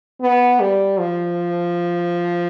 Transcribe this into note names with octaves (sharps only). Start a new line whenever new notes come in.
B3
G3
F3